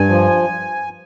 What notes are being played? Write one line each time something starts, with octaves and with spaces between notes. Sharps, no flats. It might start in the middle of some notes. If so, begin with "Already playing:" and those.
Already playing: G2 G#5
F3